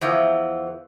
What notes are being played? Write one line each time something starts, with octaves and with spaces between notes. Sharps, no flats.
E2 E3 F3